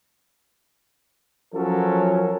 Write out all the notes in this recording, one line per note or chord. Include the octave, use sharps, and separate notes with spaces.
F3 F#3 C#4 A4 A#4